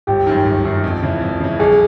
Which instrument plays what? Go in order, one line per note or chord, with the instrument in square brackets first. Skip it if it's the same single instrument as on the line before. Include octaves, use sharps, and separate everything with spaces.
[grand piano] G1 [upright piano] G4
[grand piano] F#2 D#3
G1
F#2 D#3
F2
C#3 E3
F2
C#3 E3
[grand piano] B1 [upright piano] G#4